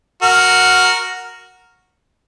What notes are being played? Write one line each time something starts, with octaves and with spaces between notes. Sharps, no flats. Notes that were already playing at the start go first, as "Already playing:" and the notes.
F#4 A#4